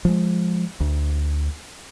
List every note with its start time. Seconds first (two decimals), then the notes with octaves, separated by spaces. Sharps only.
0.05 F3 G#3
0.80 D2